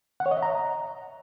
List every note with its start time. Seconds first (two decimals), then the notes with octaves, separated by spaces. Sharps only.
0.20 F#5
0.26 C#5
0.31 D#5
0.37 E5
0.43 A#5